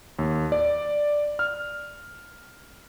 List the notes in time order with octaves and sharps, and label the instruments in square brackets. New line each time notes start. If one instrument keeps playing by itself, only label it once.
[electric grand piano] D#2
D5
F6